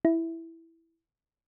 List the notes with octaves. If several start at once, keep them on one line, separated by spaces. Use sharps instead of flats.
E4